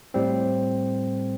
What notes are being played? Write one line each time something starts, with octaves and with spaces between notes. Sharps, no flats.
A2 G3 C4